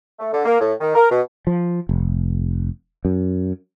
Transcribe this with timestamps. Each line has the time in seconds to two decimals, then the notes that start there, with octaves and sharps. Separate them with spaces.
0.19 A3
0.33 D3
0.45 A#3
0.60 A2
0.80 D#3
0.95 A#4
1.11 B2
1.47 F3
1.89 F1
3.05 F#2